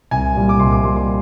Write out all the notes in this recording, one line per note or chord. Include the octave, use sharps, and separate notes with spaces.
C2 G#5
A#2 G3
D6
C2 C6
D6
A#2 G3 C6
C6